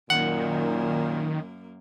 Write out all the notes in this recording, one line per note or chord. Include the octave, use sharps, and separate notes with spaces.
F#2 A#2 D#3 A#3 F#5